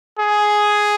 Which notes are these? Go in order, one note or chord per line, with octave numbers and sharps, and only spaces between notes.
G#4